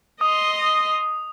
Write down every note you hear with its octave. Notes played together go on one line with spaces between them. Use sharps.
D#5 C6 D#6